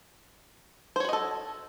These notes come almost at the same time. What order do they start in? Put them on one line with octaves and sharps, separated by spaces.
C5 C#5 F#4 D#5 A4